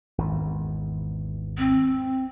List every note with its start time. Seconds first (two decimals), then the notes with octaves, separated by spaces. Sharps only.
0.18 G#1 E2
1.58 C4